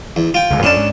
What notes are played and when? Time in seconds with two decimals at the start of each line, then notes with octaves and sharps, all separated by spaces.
0.16 E2
0.34 F4 G5
0.50 C#2 D3 G#3
0.63 F2 F3 C#4 D4 A5
0.76 G#2